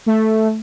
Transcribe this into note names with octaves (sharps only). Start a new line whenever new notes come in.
A3